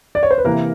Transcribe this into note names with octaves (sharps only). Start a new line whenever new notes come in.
D5
C#5
C5
B4
C3 E3 A#3 A#4